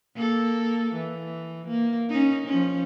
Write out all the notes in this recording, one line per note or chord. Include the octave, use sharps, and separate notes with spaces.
A#3 A4
E3
A#3
C#4 D#4
F3 C#4